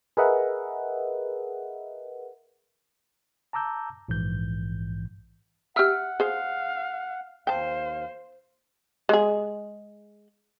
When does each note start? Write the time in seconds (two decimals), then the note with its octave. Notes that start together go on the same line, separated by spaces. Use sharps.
0.17 G#4 A#4 B4 D#5 E5 F#5
3.53 A5 A#5 D6 E6 G6
4.08 A#1 G#2 E3 G6
5.76 G4 E5 F#5 B5 E6 F6
6.20 G#4 C5 F5
7.47 D#2 C5 F5 G5 A5
9.09 G#3 G#4